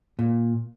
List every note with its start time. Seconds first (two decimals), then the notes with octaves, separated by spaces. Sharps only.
0.19 A#2